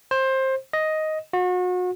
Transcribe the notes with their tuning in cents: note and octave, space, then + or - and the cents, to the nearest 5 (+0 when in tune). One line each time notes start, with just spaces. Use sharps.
C5 +20
D#5 +5
F#4 -35